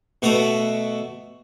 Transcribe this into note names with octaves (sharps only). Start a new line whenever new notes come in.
B2 A3 F#4 B4 E5 A#5